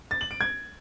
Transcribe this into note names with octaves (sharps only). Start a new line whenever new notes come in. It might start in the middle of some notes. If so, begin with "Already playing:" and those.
A6
F#7
D7
G#6